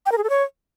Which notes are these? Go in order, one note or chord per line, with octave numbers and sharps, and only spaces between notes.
G5
A#4
G#4
A4
C#5